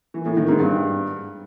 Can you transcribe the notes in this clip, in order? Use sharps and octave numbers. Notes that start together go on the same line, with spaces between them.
E3
A2
D#3
G#2
G2